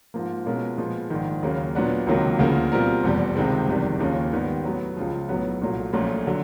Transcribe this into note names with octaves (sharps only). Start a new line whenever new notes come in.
G#2 F3 A#3
B2 G#3 C#4 F4 A#4
A#2 F3 G#3 B3
A#1 G#2 D#3
D#2 C#3 F#3 A#3
A#2 F#3 B3 D4
C#2 C3 D#3 F#3 A#3
D2 C#3 F3 A#3
B2 G3 C4 F4 A#4
F1 E2 B2 G3
C#2 C3 D#3 G#3 C4
F#1 E2 C3 D#3 G3
D#2 C#3 F3 A#3 C#4
G#2 D#3 G3 B3
A2 F#3 B3
C#2 C#3 F3
B1 A2 F#3 B3
C2 A#2 F#3 A3
A#1 A#2 F#3 A3 C#4
D3 F#3